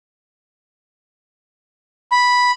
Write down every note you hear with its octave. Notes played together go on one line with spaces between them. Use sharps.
B5